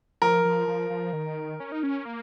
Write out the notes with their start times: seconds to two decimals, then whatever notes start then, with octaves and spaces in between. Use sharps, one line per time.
0.22 F3 A#4
0.45 F3
0.68 F3
0.90 F3
1.13 D#3
1.60 C#4
1.72 D#4
1.83 C#4
2.05 A#3